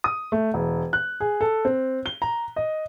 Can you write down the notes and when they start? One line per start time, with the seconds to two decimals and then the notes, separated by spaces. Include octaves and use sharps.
0.04 D#6
0.32 A3
0.54 E1
0.93 F#6
1.20 G#4
1.41 A4
1.65 C4
2.06 G7
2.22 A#5
2.56 D#5